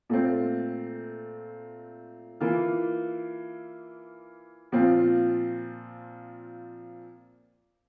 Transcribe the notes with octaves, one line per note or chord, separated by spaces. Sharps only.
A#2 A3 C4
E3 A#3 F4
A#2 F3 C4 F4